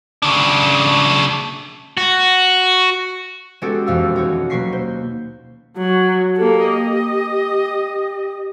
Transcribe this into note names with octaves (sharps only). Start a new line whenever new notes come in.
C#3 D4
F#4
G#3 B3 C#4 F#4 G4 A4
E1 F2 F5 E6
D#2 F#4 C#5
B2 F#3 A#3 C#6 B6 C7
C5
F#3 F#4
A#3 G4 A4
D#5